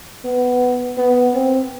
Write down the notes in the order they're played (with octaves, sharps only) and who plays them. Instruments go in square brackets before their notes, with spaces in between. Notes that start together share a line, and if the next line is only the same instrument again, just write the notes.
[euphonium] B3
B3
C4